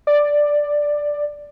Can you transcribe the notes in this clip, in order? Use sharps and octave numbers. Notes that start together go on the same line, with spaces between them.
D5